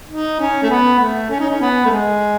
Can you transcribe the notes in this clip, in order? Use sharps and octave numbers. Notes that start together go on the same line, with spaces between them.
D#4
C#4
A3
B3
A3
C#4
D#4
C#4
B3
A3
G#3